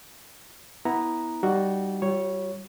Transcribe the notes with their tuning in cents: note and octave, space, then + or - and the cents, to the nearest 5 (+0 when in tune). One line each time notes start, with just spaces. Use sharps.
B3 +0 E4 -15 A#5 +0
G3 -15 D#4 +0 F#4 +0
G3 -25 F4 +30 C#5 +0